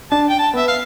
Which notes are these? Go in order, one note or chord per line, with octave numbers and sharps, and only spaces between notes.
D4 A5
G5
A5
B3 E5
F5